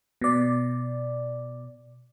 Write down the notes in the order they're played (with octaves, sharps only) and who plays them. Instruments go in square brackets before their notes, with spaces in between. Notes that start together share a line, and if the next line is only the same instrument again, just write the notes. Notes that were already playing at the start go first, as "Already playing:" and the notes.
[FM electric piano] B2 D5